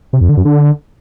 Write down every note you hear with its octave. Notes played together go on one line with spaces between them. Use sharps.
C3
F2
D3
F#2
D3